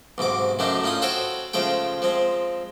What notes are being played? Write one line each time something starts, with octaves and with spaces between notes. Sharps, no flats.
B1 G#2 C3 D6
F#2 C#3 G#3 A3 D4 D#4
A2 C#4 D#4 F4 D#6
F#4 A4 C5 C#5 G5
C#3 F3 G#3 A3 G5
F3 G#3 C4